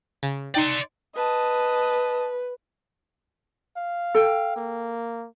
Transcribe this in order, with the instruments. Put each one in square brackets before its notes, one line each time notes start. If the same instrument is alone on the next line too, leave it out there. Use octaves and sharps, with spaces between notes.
[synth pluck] C#3
[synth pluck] D#4 G5 [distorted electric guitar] D5 C6
[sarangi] B4 [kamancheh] D#5 A5
[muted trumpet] F5
[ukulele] A4 G5
[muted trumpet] A#3